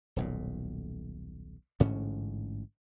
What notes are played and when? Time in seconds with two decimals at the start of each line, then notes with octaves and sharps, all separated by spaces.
0.16 D#1 B1 A#2
1.80 A1 G#2 D3 C#4